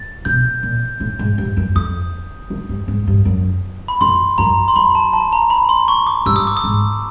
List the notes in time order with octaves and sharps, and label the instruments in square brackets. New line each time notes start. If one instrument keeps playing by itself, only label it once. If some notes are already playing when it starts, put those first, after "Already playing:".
Already playing: [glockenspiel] A6
[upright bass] B2 [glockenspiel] G6
[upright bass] A#2
A2
G#2
G2
F#2
[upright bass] F2 [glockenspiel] D#6
[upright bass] F#2
G2
G#2
G2
F#2
[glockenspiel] B5
[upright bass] F#2 [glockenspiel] C6
[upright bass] F#2 [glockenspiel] A#5
[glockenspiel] C6
[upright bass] F#2 [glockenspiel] B5
[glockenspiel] A5
A5
A#5
B5
C6
C#6
D6
[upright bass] G2 [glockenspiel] E6
[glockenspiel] D#6
D6
D#6
[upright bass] G#2